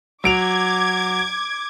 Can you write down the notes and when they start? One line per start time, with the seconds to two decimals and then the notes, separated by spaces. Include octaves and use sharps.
0.24 F#3 D6 G#6 D7 F7